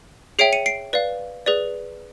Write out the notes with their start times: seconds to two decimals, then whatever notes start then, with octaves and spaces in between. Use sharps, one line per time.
0.39 G#4 C#5 E5 G5 C7 D7
0.53 C#7 D#7
0.66 C7 D7
0.93 B4 D5 F5
1.46 G#4 B4 D5